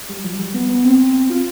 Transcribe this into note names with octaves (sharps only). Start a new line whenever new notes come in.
G3
F3
G3
B3
B3
C4
F4